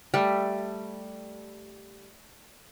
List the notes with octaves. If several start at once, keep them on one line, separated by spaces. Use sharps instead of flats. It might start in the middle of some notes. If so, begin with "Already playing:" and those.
G3 A3